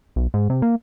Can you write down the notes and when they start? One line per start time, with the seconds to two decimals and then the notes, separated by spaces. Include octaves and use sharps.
0.16 B1
0.34 G#2
0.50 C3
0.62 A#3